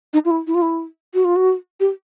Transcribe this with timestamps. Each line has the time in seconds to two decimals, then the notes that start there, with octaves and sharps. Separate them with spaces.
0.13 D#4
0.25 F4
0.31 E4
0.47 E4
0.55 F4
0.62 E4
1.14 F#4
1.25 F4
1.36 F#4
1.80 G4